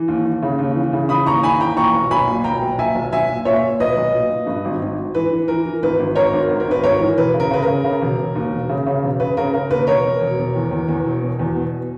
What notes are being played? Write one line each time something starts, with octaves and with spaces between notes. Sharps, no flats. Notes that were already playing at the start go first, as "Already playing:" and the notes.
Already playing: E3
D#2
D#2
C#3
D#2
E3
C#3
E3 B5 D#6
D#2 A#5 C#6
D#2 G#5 B5
E3 G5 A#5
A#2 A#5 C#6
B1
B1 G#5 B5
A#2
B1 G5 A#5
B1
A#2 E5 G#5
B1
B1 E5 G#5
A#2
A#2 C#5 E5
A#2
B1 B4 D#5
B1
A#2
A#2
G2
G#1
G#1
G#1
E3 B4
E3
E3 A#4
E3
G#1 B4
G#1
G#1 A#4 C#5
G#1
G#1
A#4
G#1 B4
G#1 A#4 C#5
E3
E1 B4
C#3
A#4
C#3 B4
A#4
C#3
C#3
E1
E1
D#2
E1
C#3
C#3
E1
C#3 B4
C#3 A#4
C#3 A#4
D#2 B4
E1 A#4 C#5
B2
E1
E1
E2
E2
E2
E1
B2
E2
B2